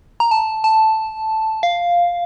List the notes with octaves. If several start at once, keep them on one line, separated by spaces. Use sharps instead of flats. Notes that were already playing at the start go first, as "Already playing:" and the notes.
A#5
A5
A5
F5